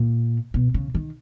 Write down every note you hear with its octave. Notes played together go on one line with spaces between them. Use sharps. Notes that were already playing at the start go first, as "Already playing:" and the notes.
Already playing: A#2
B2
C#3
D#3